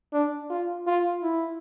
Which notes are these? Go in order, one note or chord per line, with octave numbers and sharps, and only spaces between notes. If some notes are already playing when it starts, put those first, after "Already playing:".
D4
F4
F4
E4